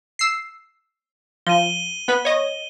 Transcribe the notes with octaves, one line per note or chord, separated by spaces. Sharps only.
E6 C7
F3 D#7 G7
B3 B4 B5
C#5 D#5